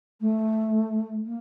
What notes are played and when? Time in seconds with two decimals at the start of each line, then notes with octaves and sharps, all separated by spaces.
0.21 A3
1.26 A#3